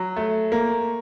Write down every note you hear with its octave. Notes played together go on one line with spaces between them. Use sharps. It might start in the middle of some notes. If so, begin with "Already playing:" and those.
Already playing: F#3
A3
A#3